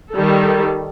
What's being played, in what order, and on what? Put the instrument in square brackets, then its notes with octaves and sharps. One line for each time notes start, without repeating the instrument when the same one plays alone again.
[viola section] D#3 G3 A4